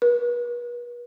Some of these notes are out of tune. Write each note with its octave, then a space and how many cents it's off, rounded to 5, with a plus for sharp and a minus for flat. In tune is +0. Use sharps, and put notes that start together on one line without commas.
B4 -40